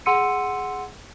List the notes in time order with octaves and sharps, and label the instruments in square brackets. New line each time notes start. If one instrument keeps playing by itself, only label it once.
[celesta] G#4 F#5 C6 E6 C#7 D#7